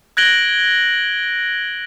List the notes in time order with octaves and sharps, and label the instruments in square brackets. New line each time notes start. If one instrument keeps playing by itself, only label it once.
[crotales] F#6 G#6 A#6 D7 F#7 G7